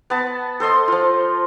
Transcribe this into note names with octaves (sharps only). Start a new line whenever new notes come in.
B3 A5
A4 C5 D#5 C6
F3 F4